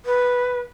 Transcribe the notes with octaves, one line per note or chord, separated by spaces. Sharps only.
B4